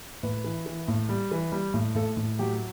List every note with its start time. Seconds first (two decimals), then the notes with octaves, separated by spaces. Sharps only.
0.23 A2 B4
0.44 E3
0.66 E3
0.88 A2
1.09 G3
1.31 E3
1.52 G3
1.74 A2
1.95 A2 A4
2.17 A2
2.39 F#3 G4